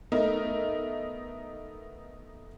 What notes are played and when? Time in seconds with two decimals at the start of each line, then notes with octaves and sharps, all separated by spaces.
0.12 A3 B3 D#4 A#4 E5